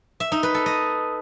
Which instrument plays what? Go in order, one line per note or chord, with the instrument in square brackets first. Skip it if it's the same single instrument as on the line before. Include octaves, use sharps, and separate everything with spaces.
[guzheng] E5
D#4
B4
A4
D#5